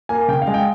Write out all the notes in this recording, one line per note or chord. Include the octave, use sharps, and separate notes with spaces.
A#3 G#5
C#3 G5
F5
G#3
G5